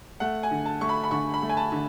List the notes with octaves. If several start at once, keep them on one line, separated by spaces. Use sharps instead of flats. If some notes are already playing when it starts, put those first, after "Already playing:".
A3 F#5
G#5
D3
A5
A3 C#6
B5
B5
D3 C#6
B5
A3
G#5
A5
D3